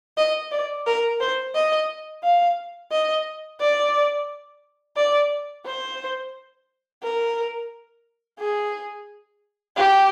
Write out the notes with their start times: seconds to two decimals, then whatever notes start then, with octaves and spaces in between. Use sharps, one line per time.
0.17 D#5
0.52 D5
0.87 A#4
1.20 C5
1.55 D#5
2.23 F5
2.92 D#5
3.60 D5
4.97 D5
5.66 C5
7.03 A#4
8.39 G#4
9.77 G4